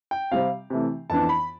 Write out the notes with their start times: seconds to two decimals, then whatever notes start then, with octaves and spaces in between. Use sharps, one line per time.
0.11 G5
0.31 C3 G3 C4 F5
0.70 C3 E3 A3
1.10 F2 E3 B3 D4 A5
1.29 B5